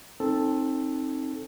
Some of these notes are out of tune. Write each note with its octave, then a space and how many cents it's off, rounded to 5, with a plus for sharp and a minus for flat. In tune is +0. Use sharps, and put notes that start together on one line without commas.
C4 +30 D#4 +0 A4 +0